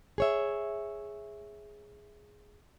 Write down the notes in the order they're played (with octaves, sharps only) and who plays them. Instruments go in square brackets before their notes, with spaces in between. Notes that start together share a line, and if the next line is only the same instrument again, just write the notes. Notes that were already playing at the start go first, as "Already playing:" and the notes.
[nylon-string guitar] G#4 C#5 E5